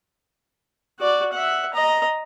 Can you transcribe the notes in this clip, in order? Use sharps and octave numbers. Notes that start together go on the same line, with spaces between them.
F#4 D5
E5 F#5
D#5 A#5